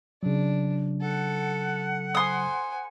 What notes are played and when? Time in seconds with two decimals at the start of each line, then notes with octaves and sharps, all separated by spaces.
0.23 C#3 F#3 D4
1.01 A4 F#5
2.15 C5 G#5 C6 D#6